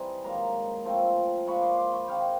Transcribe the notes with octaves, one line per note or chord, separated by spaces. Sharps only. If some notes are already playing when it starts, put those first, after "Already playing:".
Already playing: E3 G3 C4 D#4 G#5
G#2 D#3 F#3 A#3 A#5 C6
F3 A3 C4 F4
A#2 F3 G#3 B5 C#6
C6 D6
C6 D6
B5 C#6
D#3 G#3 C4 F5 G5